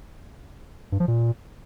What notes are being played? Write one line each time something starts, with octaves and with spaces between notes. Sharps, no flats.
G2
F3
A#2